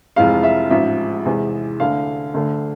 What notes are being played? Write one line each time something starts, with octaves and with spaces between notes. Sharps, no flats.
F1 F2 E3 G#3 F5
E5
A1 G#2 F3 E5
E2 C3 E3 G#3
D2 D3 A3 F5
D2 D3 A3